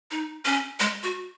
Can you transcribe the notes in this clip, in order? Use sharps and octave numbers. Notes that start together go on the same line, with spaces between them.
D#4
C#4
G#3
F#4